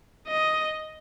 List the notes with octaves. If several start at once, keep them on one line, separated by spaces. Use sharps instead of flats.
D#5